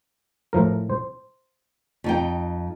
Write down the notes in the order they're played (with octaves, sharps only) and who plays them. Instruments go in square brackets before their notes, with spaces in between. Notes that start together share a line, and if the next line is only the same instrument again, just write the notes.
[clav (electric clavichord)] A2 F3 A#4
C5
[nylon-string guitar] F2 D#4 G5